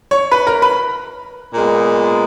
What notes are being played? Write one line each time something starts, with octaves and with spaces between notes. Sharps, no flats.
C#5 C#6
B4 B5
A#4 A#5
B4 B5
A#2 G#3 B3